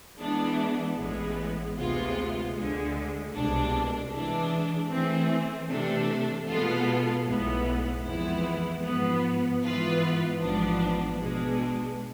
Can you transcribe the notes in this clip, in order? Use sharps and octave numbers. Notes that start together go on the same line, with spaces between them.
E3 G#3 B3 D4
A1 A2 G#3 B3
D2 C3 G#3 B3 F4
D2 D3 G#3
C2 B2 G#3 D4
E3 G#3 D4
E3 A3 C4 G#4
C3 E3 A3 D4 A4
B2 G#3 B3 F4 A4
B1 A2 G#3 B3
F2 E3 G#3 B3 E4
G#2 F3 B3
G#2 E3 B3 F4 B4
A1 G#2 F3 B3 D4
B2 G#3 D4